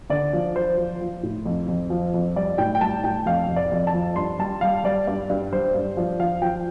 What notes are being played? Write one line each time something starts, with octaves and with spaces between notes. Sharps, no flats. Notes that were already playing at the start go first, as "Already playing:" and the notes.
D3 D5
F3
F3 C5
F3
F3
A2
F2
F2
F3
F2
G3 D5
A2 G5
G5
G3 A5
A2 G5
F2 F5
F2
D5
F2
A5
F3
G2 C6
G3 A5
G3 F5
G3 D5
G2 D5
G2
G3 C5
G2
F3 D5
F3 F5
F3 G5